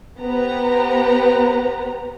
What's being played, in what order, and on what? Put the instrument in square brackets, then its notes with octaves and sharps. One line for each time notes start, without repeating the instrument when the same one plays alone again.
[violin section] B3 G4 B4 C5 A#5